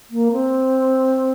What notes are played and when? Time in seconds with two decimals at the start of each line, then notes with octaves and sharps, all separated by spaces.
0.10 A#3
0.32 C4